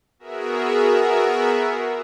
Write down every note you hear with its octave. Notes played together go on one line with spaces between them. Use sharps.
B3 F#4 G#4 A#4 E5